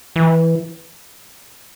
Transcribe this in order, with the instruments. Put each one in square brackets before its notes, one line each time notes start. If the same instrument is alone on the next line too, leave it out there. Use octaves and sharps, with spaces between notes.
[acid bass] E3